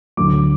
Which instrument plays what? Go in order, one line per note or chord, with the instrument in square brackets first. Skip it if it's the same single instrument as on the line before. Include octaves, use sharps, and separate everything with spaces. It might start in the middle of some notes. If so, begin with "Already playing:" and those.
[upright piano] D2 D3 F#3 D6